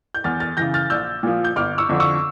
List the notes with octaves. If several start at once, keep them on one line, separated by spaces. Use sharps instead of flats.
G6
E2 F6 A6
F6 A6
C#3 E3 G6 A#6
F6 A6
A#1 E6 G6
A#2 F3
G6
G1 D6 F6
C#6 E6
F2 D3 F3
C#6 E6